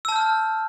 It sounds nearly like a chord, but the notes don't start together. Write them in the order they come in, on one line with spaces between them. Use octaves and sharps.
E6 A5 G6 F6